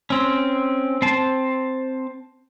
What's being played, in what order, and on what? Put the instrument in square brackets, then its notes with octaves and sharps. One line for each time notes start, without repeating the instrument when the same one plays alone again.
[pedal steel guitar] C4 C#4
C4 A5